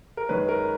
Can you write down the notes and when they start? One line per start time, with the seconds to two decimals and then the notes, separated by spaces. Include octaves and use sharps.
0.17 A#4
0.29 F#2 D#3 G#3 C#4 B4
0.49 A#4